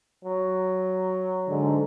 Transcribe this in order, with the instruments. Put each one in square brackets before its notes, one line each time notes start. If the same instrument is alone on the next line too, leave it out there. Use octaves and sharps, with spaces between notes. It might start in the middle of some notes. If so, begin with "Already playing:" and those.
[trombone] F#3
[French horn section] G#2 D3